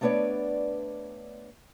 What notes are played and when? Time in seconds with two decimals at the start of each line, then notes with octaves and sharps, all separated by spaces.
0.01 A3 B3 D4 B4 C#5 D5